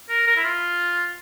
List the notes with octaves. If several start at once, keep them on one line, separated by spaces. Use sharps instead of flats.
A#4
A#4
E4
F4